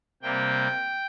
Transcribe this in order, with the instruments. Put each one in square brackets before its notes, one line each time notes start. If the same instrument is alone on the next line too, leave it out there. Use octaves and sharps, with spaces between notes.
[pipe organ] C3 G3 A#3 G5